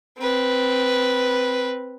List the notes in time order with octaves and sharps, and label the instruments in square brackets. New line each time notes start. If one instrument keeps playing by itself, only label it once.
[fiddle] C4 B4